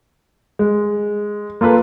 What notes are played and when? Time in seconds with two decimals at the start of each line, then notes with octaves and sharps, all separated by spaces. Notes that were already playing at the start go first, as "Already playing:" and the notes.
0.59 G#3
1.61 A#3 F4 A4 B4